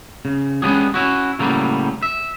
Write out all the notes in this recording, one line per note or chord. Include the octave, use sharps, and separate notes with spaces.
C#3
G#3 B3 C#4 D4 G4 G#4
C#4 E4 F#4
A2 C#3 F#3 G3 A#3
E5